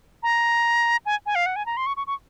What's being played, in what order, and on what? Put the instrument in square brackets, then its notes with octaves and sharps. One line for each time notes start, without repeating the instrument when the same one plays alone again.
[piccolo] A#5
G#5
G#5
F5
F#5
G#5
A#5
C6
C#6
C#6
C#6